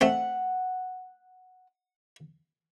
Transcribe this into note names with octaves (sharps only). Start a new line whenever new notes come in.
A3 C4 F#5